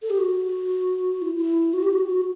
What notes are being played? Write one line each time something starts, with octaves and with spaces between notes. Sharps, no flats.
A4
G4
F#4
E4
E4
F#4
G4
F#4
F#4